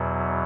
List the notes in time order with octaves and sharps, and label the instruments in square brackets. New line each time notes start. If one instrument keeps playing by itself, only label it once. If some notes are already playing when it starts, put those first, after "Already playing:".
Already playing: [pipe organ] E2 B2 F#3